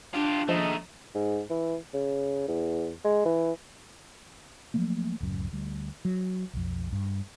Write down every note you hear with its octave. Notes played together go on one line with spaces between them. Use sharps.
D4 F4 G4
D#2 F3 A3 D#4 G#4 D#5
G#2
E3
C#3
E2
G#3
E3
F3 F#3 A3 A#3
D1 C#2 F#2
D2 G3
F#3
B1 F2
G2